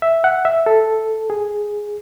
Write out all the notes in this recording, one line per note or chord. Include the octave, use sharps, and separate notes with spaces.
E5
F#5
E5
A4
G#4